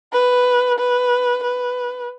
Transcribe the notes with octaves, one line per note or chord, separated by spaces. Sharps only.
B4
B4
B4